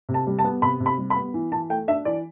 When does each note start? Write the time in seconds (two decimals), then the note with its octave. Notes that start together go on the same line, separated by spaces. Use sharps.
0.09 C3
0.14 A5
0.27 G3
0.39 A5
0.44 B3
0.62 C3 B5
0.80 C3
0.86 B5
0.98 G3
1.10 B5
1.16 B3
1.34 E3
1.52 E3 A5
1.70 A3 G5
1.88 D4 E5
2.05 E3 D5